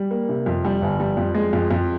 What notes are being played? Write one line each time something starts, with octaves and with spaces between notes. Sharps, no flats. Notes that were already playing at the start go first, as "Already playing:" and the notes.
Already playing: G3
A#3
C3
F2
G3
G1
G3
F2
G#3
F2
F2